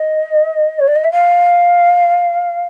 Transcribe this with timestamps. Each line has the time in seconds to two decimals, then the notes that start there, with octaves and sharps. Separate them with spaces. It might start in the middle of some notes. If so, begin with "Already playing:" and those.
Already playing: D#5
0.79 C#5
0.88 D5
0.96 D#5
1.04 E5
1.12 F5